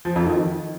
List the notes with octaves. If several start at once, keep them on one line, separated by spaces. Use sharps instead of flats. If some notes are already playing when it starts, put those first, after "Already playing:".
F3
F2
D#3
D#3